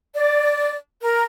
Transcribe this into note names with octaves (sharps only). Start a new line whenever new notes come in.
D5
A#4